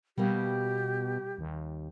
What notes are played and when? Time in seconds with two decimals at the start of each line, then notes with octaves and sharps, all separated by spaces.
0.18 B2 G3 A#3 G4
1.38 D#2